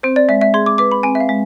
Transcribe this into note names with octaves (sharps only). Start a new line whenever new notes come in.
C4 C5
D5
G#3 E5
E5
G#4 C6
D6
B4 D6
B5
C4 G#5
E5
F5
G#3